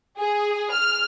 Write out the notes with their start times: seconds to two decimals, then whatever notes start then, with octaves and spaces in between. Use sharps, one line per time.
0.18 G#4
0.72 F6